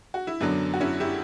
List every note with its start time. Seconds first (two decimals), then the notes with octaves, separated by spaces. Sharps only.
0.14 F#4
0.27 E4
0.40 F#2 D3 F#3 B3 D4
0.74 F#4
0.81 C#4 E4
1.00 E4 G4